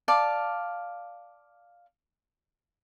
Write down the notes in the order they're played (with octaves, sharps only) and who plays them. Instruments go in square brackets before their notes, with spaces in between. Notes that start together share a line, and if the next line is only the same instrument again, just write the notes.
[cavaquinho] D5 F5 A5